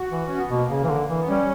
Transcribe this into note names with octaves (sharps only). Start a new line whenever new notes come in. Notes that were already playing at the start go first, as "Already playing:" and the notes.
Already playing: F#4
E3
C#4
B3
B2 A#3
C#3
E3
D3
E3
B3
G3 C#4